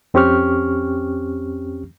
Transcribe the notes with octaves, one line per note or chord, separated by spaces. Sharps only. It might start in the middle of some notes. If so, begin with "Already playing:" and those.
F2 C4 C#4 G4 C#6 F6